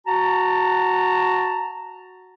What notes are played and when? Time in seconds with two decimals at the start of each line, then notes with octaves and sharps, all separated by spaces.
0.07 F#4 A5 A#5